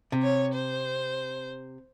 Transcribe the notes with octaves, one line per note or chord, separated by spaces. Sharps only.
C3
C#5
C5